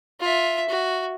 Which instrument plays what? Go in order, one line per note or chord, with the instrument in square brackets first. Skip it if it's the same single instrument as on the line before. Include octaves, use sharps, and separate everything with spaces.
[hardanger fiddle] F4 E5
F#4